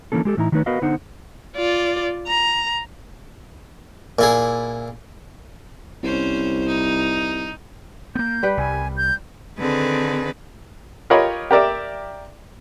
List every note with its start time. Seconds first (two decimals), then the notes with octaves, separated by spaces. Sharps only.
0.12 D3 E3 A#3 C#4 A4
0.25 G#3 G4 A4
0.37 A2 E3 D#4 E4 A#5
0.52 D#3 F#3 A3 D#4 B4 C#5
0.66 B3 F#4 A#4 B4 D#5 F5
0.82 D3 B3 D#4 C5 F#5
1.56 F4 D5
2.27 A#5
4.19 A#2 E4 G#4
6.03 C2 C#4 C5
6.67 D#4
8.15 A#3 B3 G6
8.43 G3 B4 G5
8.57 C2 G#5
8.97 G6
9.58 D3 D#3 C4 G#4 A4 B4
11.10 F4 G4 A#4 C#5 D#5 B5
11.51 G4 A#4 D5 E5